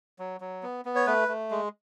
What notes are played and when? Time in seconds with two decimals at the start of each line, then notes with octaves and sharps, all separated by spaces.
0.19 F#3
0.41 F#3
0.63 B3
0.85 B3
0.95 C#5
1.07 A3 B4
1.28 A3
1.51 G#3